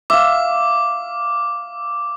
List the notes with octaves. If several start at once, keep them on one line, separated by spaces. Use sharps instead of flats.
E5 F5 D6